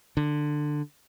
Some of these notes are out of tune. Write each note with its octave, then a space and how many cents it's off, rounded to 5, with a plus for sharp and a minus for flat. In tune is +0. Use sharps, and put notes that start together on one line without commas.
D3 +15